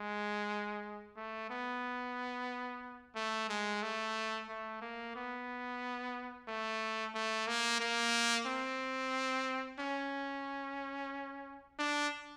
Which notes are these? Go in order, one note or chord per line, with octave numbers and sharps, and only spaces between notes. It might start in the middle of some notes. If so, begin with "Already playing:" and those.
Already playing: G#3
A3
B3
A3
G#3
A3
A3
A#3
B3
A3
A3
A#3
A#3
C4
C#4
D4